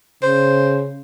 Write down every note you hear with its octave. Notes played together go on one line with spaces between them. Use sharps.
C#3 C5